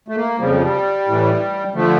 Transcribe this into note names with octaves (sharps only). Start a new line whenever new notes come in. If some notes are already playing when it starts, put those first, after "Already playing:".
A3
A#3
F2 C#3 F3 G3
G3
A2 E3
D3 F3 A3